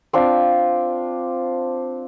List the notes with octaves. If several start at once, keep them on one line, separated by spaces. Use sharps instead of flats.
C4 D4 F4